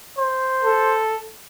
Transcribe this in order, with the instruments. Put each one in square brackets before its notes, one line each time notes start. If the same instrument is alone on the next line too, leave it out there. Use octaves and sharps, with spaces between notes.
[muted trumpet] C5
[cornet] A4